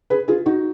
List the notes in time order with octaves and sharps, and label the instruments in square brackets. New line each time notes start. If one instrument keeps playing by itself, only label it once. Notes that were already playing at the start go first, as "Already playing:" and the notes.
[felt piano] G#4 B4
F4 G#4
D#4 F#4